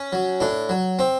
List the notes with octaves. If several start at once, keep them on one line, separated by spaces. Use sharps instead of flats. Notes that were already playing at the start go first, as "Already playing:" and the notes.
Already playing: C#4
F#3
A2 D4
F#3
C4